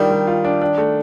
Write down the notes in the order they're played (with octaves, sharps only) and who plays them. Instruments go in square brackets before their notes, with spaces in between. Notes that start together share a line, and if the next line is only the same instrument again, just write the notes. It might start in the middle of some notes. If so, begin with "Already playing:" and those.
Already playing: [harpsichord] D#3 [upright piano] G3 D4 F4
[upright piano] G3
F4
D4
D4
A3